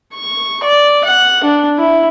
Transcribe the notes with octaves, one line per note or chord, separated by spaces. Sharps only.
C#6
D5
F#5
D4
E4